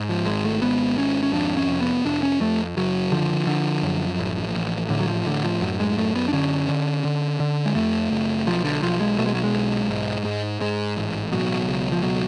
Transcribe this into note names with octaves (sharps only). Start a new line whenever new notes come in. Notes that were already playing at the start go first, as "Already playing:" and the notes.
Already playing: G#2
F3
G#1 G#3
A3
G#2 B3
G#1 C#4
C#4
F2 D4
C#4
F1
B3
F1 D4
C#4
F2 A3
F#1 F#3
D3 F3
D3
F#2
A1
A1
A2 D3
F#3
F3
A2 D3
F3
F#2 F#3
G#3
F#2 A3
B3
D4
D3 C#4
D3
D3
D3
G#3
F2 A3
F#1
B1 F3
D3
B1 F3
G#3
B2 A3
G#3
F#3
G#3
B1
G#2
G#2
G#2 G#3
A1
B2 F#3
C#2
F3
B2 F#3